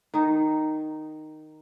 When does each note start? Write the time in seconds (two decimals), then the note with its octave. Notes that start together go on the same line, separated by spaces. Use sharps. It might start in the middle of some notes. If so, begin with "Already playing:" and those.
0.14 D#3 D#4